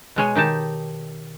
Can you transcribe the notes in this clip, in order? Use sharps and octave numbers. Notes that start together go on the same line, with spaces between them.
B2 G#3 C#5 G#5
D#3 D#4 G4 A5